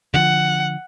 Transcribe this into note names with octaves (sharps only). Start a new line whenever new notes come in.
D3 F3 F#5